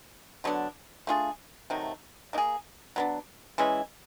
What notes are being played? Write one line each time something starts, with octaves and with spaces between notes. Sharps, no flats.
D3 F#3 B3 D4
A3 D4 F4 G#4
C3 D#3 F#3 A3
A#3 D#4 G#4
F#3 B3 D4
E3 G#3 C#4 E4